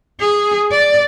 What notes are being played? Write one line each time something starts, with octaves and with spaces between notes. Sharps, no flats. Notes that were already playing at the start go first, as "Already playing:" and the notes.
G#4
D5